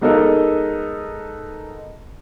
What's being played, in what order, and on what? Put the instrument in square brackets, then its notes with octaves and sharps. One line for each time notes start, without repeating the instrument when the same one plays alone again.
[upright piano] G#3 B3 D#4 A4 A#4 D#5